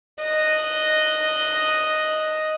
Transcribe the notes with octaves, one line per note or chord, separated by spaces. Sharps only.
D#5 F#6